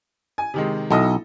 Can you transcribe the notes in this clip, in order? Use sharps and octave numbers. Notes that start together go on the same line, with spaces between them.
G#5
C3 D#3 G#3
B1 E4 A4 D#5